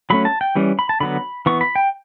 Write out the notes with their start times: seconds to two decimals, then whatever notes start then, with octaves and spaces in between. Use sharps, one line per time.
0.10 F#3 A3 C#4 B5
0.25 A5
0.41 G5
0.56 E3 G3 C#4
0.79 B5
0.89 A5
1.00 D3 F#3 B3 B5
1.46 E3 B3 C#6
1.61 B5
1.76 G5